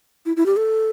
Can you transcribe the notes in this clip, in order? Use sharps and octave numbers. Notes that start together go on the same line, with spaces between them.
E4
E4
G4
A4